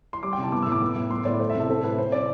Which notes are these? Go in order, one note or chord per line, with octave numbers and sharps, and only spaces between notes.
C6
G3 D6
G5
C3 A5
B3 D6
A2 E6
D6
B3
A2
B3 C6
A2 D5
A3 C5
E5
C3 A4
C4 A4
A2 B4
C4 C5
C3 D5